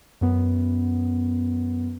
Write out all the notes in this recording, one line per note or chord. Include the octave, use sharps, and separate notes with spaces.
F#2 B3